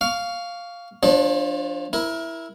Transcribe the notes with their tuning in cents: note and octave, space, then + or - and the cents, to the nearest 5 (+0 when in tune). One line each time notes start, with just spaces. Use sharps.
F5 +0 C#6 +25
F3 +0 D4 +0 C#5 -40
E4 +0 A#4 +25